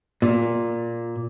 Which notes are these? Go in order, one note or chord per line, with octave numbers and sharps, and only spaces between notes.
A#2